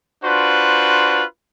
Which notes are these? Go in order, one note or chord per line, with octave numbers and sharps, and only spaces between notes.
D4 F4 F#4 B4 C5